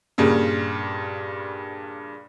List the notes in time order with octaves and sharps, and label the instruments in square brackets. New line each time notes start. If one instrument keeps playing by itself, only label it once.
[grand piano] G2 A#2 C#3